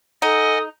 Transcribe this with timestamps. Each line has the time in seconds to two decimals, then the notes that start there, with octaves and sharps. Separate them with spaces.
0.22 D#4 A4 D#5 F#5 G#5 D#6